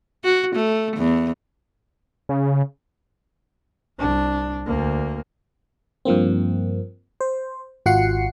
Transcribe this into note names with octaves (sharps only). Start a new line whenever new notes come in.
F#4
A3
E2
C#3
C2 D4
D2 A#3
G2 F3 A#3 C4
C5
G#1 F4 F#4 F#5 C7 C#7